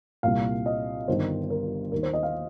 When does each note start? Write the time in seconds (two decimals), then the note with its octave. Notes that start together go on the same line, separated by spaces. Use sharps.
0.23 C2 A#2 F5
0.66 D#5
1.08 G1 G2 D#3 C5
1.50 A#4
1.92 D#2 D#3 A#4
2.03 C5
2.14 D#5
2.23 F5